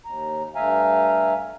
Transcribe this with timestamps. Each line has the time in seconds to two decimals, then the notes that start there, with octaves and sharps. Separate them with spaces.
0.05 D#2 A#5
0.56 G2 A3 E5 F5 G#5 A#5